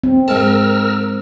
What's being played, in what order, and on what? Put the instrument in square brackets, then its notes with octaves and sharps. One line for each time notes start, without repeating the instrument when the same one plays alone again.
[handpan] C4
[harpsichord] G#2 A5 [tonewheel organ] A#4 E6 F6